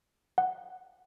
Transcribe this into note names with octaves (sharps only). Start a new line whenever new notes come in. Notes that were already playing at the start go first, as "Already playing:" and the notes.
F#5